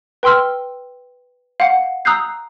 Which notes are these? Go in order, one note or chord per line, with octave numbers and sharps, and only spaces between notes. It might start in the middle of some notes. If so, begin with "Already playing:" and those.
B4 G5 C6 E6 F6
F5 F#5
A#5 D#6 E6 F#6 G6 C7